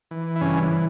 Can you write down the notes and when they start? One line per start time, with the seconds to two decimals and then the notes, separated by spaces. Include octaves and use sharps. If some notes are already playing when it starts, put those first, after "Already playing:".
0.11 E3
0.36 E4
0.41 G2 C#3 C#4